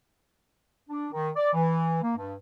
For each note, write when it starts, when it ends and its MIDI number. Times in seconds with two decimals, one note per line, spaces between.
0.90 1.07 62
1.12 1.29 51
1.36 1.49 74
1.53 1.99 52
2.02 2.14 58
2.17 2.34 43